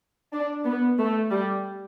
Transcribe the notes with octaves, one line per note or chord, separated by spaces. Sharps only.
D4
B3
A3
G3